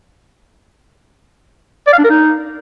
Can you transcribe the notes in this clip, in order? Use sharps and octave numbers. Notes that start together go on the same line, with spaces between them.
D5
F5
D4
A#4
D#4